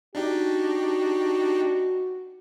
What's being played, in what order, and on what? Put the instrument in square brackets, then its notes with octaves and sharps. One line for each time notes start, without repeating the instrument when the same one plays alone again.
[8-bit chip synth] D4 D#4 G4 [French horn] F#4